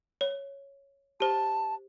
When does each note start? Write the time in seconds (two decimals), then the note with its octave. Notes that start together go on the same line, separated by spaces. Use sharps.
0.21 C#5
1.20 G4 C5 A5